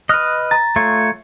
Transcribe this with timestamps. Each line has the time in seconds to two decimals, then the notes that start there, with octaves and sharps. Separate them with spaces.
0.09 B4 D#5 F6 F#6
0.51 A#5 A6
0.76 A3 F4 C#5